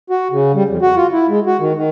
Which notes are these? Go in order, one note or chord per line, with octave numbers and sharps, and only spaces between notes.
F#4
C#3
G3
F2
F#4
F4
E4
G#3
F#4
D#3
D#3